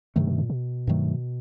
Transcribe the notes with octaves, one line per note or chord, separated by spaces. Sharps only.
G2 C3 D#3 F#3 A3
B2
A#2
B2
G2 D#3 F#3 A3